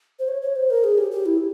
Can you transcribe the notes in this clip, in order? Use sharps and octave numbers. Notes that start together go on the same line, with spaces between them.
C5
C#5
C#5
C5
A#4
G#4
G4
G4
E4